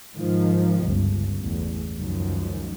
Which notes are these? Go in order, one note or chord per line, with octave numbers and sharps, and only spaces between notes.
G#2 D#3 F3
G1 C#2 G2
A1 E2
C#2 F#2 D#3 F3